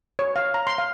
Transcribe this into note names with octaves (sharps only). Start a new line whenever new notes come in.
C#5
F5
A#5
C6
F5